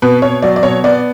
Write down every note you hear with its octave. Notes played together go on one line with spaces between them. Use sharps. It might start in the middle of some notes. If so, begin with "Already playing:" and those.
B2 B4
B2 C#5
F#3 D5
D5
B2 C#5
B3 D5